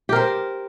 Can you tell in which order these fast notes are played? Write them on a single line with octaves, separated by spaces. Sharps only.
G4 A#4 C5